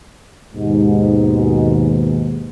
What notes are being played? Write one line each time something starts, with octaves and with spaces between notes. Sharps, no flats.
D#2 G#2 B2